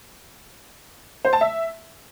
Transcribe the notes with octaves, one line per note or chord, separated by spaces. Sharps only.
C5
A5
E5